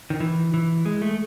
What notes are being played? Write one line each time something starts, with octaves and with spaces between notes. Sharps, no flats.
D#3
E3
E3
G#3
A3